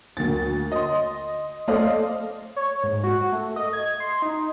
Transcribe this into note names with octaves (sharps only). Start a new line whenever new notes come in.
D2 A#3 A6
D#5 C6
A3 A4 C5 D5 D#5 F5
C#5
G#2
F#4
A3
D#5
G#6
C6
D#4